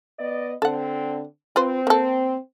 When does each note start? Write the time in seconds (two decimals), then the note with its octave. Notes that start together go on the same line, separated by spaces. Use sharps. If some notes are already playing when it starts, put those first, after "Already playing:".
0.19 B3 D5 D#5
0.62 D3 C4 A4 F#5
1.56 C4 F4 B4 C5
1.87 A#3 A4